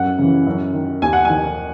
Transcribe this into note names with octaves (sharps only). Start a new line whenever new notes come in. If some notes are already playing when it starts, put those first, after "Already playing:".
Already playing: F#2 F#5
C#3 E3
F#2
D#3
D#2 G#5
F#5
D#3 G#5